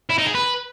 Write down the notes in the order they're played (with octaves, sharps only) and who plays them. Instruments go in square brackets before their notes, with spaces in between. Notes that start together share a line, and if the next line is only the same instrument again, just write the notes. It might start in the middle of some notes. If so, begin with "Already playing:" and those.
[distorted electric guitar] E4
D#4
G#4
B4